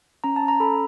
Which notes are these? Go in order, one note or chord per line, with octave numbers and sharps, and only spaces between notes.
C#4 A#5
A5
C#4
A#5
A4 B5